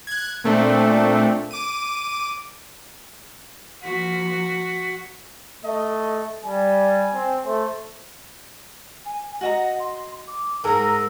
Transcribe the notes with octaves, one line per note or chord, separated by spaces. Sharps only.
F#6 G#6
A#2 A3 C4 D4
D6 D#7
F3 A#3 F#4 B6
A3 D#5
G3 G#5
C4
A3 C5
G#5
F#4 D#5 F#5 A#5
C6
D6
G#2 A#4 G#5 A#5 E6